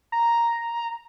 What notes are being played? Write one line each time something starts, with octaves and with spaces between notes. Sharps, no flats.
A#5